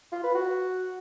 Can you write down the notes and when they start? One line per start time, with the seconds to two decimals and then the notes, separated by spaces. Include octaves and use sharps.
0.12 F4
0.23 B4
0.35 F#4